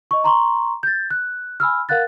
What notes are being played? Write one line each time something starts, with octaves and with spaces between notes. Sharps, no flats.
D#5 C#6
A#5 C6 C#6
G6 A6
F#6
G#5 B5 E6 F6
A#4 F5 F#5 F#6 A6